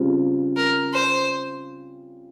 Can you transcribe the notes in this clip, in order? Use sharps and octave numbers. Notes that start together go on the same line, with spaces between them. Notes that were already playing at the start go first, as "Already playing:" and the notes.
Already playing: C#3 G3 C4 F4
A#4
C5